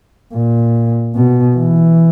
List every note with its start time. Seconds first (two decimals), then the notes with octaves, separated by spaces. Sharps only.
0.33 A#2
1.15 B2
1.57 E3